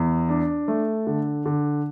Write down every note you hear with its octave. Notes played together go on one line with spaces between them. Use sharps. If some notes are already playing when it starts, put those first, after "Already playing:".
Already playing: E2
D4
A3
D3
D3